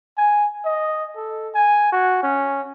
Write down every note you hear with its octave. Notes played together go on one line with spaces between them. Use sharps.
G#5
D#5
A4
G#5
F#4
C#4